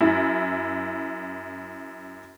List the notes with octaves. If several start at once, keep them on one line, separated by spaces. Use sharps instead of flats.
F#2 E4